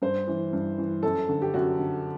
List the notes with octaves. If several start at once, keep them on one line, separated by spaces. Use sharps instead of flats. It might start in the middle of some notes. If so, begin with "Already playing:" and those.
G2 C5
E3
G2
E3
F#2 A4
D3
G4
F#2 F#4
D3